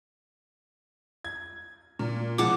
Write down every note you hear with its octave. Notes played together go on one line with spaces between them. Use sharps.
G#6
A#2
B2 F3 G#3 F#5 D6